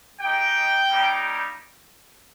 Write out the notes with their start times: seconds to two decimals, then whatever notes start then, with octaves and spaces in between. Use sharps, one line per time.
0.20 G#3 D#4 G4 G5
0.89 G3 A#3 D#4 G4